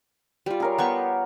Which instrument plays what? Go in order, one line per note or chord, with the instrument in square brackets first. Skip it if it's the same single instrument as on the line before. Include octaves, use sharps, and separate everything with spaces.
[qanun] G3 F4
[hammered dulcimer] G#4 A#4 C#5
[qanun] B3 G4 C#6